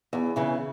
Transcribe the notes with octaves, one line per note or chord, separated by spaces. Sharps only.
E2
C#3 E3